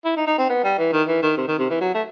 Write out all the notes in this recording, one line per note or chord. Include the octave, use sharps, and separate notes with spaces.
E4
D#4
D#4
C4
B3
G3
E3
D#3
E3
D#3
C3
D#3
C3
E3
F#3
A3